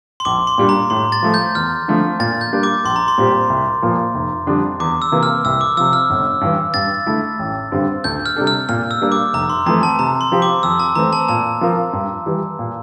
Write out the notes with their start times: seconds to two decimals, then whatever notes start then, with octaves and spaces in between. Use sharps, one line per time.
0.20 C6
0.25 A#1 D6
0.47 C6
0.58 A#2 G3 D4
0.69 A#5
0.90 A2 C6
1.12 A6
1.23 F3 A3
1.34 G6
1.55 E2 F6
1.88 D3 F3 A3 C4
2.20 A#2 A6
2.41 G6
2.53 G3 A#3 D4
2.63 D6
2.85 A#1 C6
2.96 A#5
3.08 C6
3.18 A#2 G3 C4 G4
3.50 C2
3.82 A#2 F3 A#3
4.14 F1
4.47 F2 D3 G3 D4
4.80 E2 D6
5.02 E6
5.12 C3 E3 A#3
5.23 F6
5.45 C2 E6
5.61 D6
5.77 C3 F3 E6
5.93 F6
6.10 G1
6.41 G2 E3
6.74 G2 A6
7.06 D3 A3 E4
7.39 A1
7.72 G2 D3 G3 C4
8.04 D2 G6
8.26 F6
8.36 C3 G3 D4 A4
8.47 F6
8.69 A#2 F6
8.91 E6
9.01 G3 A#3 D4
9.12 D6
9.33 F1 A#5
9.50 C6
9.66 F2 E3 A3 A#5
9.83 A5
9.99 C3 A#5
10.21 C6
10.32 F3 C4 G4
10.42 D6
10.63 F2 E6
10.80 A5
10.96 E3 A3 C4 A#5
11.13 A5
11.28 A#2 A5
11.61 F3 C4 F4 A#4
11.93 G2
12.26 E3 G3
12.59 A#2